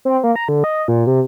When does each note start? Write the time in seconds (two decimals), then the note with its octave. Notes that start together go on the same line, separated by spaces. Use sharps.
0.05 C4
0.24 A#3
0.36 A#5
0.48 D3
0.64 D#5
0.88 A#2
1.07 C3